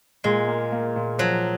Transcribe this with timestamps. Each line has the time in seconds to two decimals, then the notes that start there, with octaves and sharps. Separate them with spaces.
0.24 A#2 G#3
0.48 A#3
0.72 A#3
0.96 A#2
1.18 F3 F#3